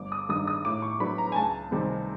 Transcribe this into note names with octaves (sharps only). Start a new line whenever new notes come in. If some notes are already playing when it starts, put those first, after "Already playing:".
Already playing: G1 D6
D#6
G2 D#3 D#6
D#6
A2 D6
C#6
F#3 B3 D4 B5
A#5
G#5
C#2 A5
C3 D#3 G3 C4